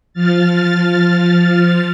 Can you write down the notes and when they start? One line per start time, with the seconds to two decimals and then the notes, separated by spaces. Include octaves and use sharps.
0.13 F3 F6 A6